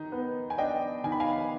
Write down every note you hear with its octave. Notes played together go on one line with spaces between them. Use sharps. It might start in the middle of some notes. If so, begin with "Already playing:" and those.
Already playing: D#3 D#4
B3
G#5
D4 D#5 G5
D#3 G#5
B5
F5 G#5